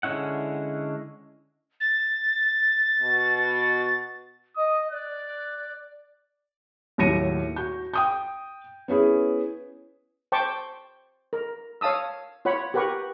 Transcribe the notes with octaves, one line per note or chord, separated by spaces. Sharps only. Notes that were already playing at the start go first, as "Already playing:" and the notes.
D3 G#3 C#4 E4 F#5
A6
B2 F#4
D#5 D#6
D5 F#6
D#2 A2 F#3 A#6 C#7 D#7
F#4 G6
G5 D#6 G6
B3 C#4 E4 G#4
C5 G5 A5 C#6 D6
A#4
C#5 F5 A5 D#6 E6
F4 C#5 F#5 B5
G4 A#4 B4 F#5 C#6